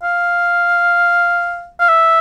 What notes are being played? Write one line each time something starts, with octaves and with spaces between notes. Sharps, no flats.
F5
F5
E5